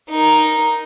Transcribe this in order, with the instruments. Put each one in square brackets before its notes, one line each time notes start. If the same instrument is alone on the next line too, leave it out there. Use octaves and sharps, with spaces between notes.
[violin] D#4 A#4